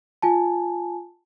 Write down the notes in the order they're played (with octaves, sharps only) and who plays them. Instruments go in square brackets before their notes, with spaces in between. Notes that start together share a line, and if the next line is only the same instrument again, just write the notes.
[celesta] F4 G#5 A5